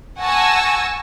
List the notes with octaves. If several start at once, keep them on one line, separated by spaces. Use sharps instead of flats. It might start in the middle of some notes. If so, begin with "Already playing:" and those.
F#5 G#5 A5 C#6 E6 A#6